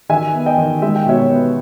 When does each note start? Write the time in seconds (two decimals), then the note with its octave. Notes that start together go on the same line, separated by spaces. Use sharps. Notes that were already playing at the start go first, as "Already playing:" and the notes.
0.09 D#3 E5 G#5
0.34 B3
0.46 D#5 G5
0.58 D#3
0.82 G#3 E5
0.96 G5
1.06 B2 C#5 E5
1.30 B3